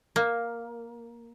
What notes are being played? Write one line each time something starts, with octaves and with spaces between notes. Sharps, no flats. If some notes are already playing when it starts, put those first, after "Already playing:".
A#3